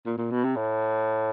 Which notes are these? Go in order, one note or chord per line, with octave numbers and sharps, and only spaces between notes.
A#2
A#2
B2
C3
A2